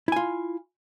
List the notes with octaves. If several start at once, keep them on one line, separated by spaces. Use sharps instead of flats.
E4 F4 G#5